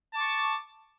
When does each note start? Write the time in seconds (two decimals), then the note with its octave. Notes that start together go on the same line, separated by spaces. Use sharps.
0.14 A5
0.17 D6
0.20 C#6